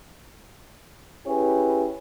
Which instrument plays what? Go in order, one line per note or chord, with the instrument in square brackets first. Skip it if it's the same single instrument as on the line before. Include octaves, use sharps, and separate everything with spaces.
[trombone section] C#4 E4 G4 G#4 B4